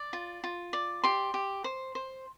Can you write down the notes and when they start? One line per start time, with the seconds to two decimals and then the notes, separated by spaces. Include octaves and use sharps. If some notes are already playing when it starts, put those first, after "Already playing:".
Already playing: D5
0.13 F4
0.44 F4
0.73 D5
1.04 G4 C6
1.34 G4
1.64 C5
1.95 C5